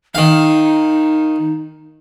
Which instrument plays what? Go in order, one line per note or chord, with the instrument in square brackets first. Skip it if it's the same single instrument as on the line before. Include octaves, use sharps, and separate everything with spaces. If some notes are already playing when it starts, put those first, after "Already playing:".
[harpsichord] D#3 F5 [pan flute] D#4